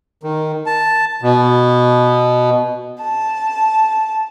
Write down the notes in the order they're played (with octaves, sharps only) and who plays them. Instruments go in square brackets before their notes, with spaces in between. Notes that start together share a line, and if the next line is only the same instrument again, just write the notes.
[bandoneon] D#3
A5
B2
[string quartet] A5